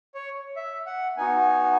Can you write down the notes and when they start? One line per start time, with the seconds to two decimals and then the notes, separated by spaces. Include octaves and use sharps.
0.15 C#5
0.56 E5
0.86 F#5
1.17 B3 D#4 F#4 G#5